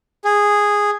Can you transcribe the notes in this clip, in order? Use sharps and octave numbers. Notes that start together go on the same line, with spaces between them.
G#4